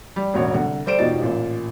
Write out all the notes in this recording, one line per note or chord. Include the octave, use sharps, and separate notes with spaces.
G3
E1 A1 F#4 C#5
C2 D3 F#5
G3 A4 C5 D5 D7 E7
E1 B2 F3 D#4 G4 A6
A1 A#2